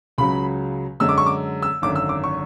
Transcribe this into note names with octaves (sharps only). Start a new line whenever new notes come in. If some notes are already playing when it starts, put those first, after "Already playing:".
C#2 C#3 F#3 B5
F#2 D3 G#3 E6
D6
C#6
D6
E6
G#1 F#2 D3 D6
E6
D6
C#6